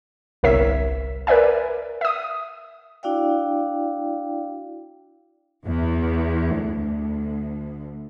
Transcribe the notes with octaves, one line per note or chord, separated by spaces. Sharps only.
G1 C2 A#4 C#5 E5 B6
A#4 B4 D5 E5 G#5
E5 D#6
D4 E4 F#4 D5 F5 G5
E2
D2